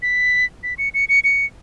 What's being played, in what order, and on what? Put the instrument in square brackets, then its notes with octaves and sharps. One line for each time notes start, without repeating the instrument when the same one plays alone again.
[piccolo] B6
B6
C#7
C#7
C#7
C#7